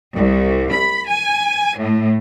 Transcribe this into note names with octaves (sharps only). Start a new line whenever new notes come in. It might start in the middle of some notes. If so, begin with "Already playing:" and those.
C2
B5
G#5
A2